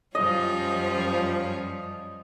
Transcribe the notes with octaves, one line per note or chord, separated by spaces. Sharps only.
F#2 F3 G3 C#4 F4 D#5